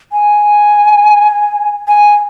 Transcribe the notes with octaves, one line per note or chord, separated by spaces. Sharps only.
G#5
G#5